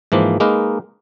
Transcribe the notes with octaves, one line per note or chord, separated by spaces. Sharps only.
G#2 E3 F3 A#3
G#3 A#3 D#4 A#4 B4